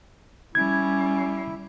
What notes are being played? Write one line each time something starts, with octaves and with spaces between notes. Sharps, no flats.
G3 C#4 E4 G#6